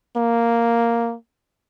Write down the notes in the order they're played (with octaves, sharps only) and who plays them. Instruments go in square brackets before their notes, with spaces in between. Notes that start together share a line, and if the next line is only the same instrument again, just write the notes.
[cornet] A#3